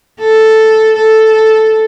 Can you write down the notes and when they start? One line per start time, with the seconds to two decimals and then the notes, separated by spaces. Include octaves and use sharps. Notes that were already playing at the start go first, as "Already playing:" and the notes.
0.20 A4
0.97 A4